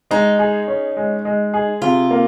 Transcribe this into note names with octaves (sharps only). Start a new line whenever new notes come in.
G#3 D#4
G#4
C#4
G#3
G#3
G#4
C3 F4
A#3